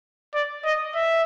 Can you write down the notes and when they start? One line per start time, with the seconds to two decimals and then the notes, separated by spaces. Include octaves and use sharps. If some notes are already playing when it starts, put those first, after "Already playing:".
0.34 D5
0.64 D#5
0.95 E5